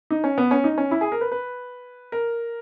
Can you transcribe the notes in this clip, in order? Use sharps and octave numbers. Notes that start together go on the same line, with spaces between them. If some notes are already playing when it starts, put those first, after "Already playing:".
D#4
C#4
B3
C#4
D#4
C#4
E4
G#4
A#4
B4
B4
A#4